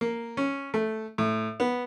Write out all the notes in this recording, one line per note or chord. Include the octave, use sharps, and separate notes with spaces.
A#3
C#4
A3
A2
B3